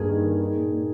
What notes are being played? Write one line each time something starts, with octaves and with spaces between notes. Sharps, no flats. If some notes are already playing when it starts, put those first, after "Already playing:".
Already playing: G2 A#3 G#4
D#3
D#3
D#4
A#2
A#2